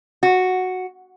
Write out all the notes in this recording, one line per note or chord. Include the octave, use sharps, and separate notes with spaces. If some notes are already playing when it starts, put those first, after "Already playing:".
F#4